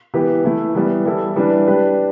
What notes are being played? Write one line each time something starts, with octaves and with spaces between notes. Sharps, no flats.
E3 B3 G4 B4
E3 A3 E4
E3 G3 B3
E3 G3 E4 A4
E3 G3 D4 B4
G3 D4 G4 B4